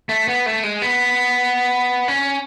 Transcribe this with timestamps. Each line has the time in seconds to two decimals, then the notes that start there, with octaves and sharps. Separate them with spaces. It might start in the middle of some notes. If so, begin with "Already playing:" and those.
0.09 A3
0.28 B3
0.46 A3
0.63 G#3
0.82 B3
2.08 C#4